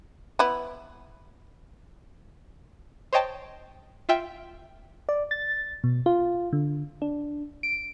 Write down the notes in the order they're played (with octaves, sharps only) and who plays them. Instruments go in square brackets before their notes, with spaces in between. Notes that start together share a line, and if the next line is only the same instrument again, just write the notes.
[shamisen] B3 E4
[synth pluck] C5 C#5 D#5 G5 A5
F4 E5 G5
[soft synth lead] D5
A6
B2
F4
D3
D4
D7